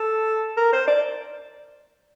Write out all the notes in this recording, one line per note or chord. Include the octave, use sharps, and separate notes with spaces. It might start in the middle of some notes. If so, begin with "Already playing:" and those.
Already playing: A4
A#4
C5
D5